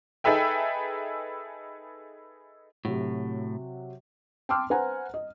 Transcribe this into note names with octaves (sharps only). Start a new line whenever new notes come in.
D#4 G#4 A4 B4 E5 G5
A2 C3 F#3 F#4
G5 A5 C6 D6 E6 F6
B4 C5 F#5 G#5 A#5
D#5